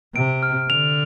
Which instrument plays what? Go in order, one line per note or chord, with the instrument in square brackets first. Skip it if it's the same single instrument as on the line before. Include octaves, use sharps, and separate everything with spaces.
[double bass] C3 [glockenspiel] D7
[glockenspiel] F6
[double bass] D3 [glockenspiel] F7